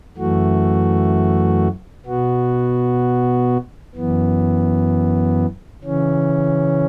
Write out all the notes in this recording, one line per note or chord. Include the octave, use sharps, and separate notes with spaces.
F#2 E3 A3 F#4
B2 B3 F#4
F#2 E3 B3
C#3 E3 C#4